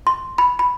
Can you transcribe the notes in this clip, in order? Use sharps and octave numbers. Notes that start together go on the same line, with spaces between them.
C6
B5
B5